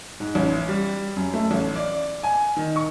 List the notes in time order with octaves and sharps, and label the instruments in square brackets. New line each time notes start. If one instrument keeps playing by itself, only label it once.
[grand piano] G#2
A1
G3
F#2
A3
A1
D5
G#5
D#3
C#6